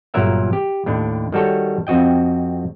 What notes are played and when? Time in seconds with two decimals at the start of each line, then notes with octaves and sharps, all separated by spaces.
0.14 G1 A#2 F#3 A#4 E5 F#5
0.53 G4
0.86 D#2 A2 D4
1.33 D#3 G3 F#4 A4 C#5
1.87 F2 C4 F#4 D#5 G5